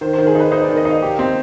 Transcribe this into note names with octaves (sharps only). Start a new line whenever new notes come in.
D#3 C5
C5
D#3
G#4
D#4 B4
D#4 C5
D5
D#3
D#5
D#4 F5
G4
C4